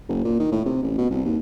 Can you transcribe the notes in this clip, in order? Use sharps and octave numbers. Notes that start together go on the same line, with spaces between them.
F#1
A#2
D#3
A2
C3
A1
B2
C2
D#2